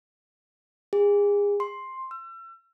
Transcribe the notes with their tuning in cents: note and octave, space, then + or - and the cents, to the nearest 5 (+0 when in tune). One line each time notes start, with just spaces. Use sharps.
G#4 -30
C6 +5
E6 +40